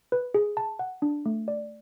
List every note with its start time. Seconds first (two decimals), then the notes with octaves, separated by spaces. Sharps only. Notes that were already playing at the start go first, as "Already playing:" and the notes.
0.12 B4
0.34 G#4
0.57 A5
0.79 F#5
1.02 D4
1.26 A3
1.48 D5